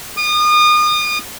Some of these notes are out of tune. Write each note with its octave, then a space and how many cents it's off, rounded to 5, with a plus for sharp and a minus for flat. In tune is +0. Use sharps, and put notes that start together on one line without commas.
D#6 -35